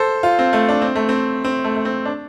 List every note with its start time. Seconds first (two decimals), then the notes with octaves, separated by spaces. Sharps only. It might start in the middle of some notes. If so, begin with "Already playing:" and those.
Already playing: A4 C5
0.23 F4
0.39 C4
0.53 A3
0.69 D4
0.82 C4
0.95 A3
1.09 C4
1.45 C4
1.64 A3
1.76 A3
1.85 C4
2.05 D4